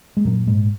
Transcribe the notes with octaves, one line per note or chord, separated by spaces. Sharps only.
G#3
F#2 A#2 F#3
G#2 G#3